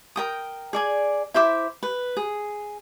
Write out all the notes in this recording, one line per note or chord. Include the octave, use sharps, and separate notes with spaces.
A#4 G5 D#6
G#4 D5 G#5
E4 C5 E5 D6
B4
G#4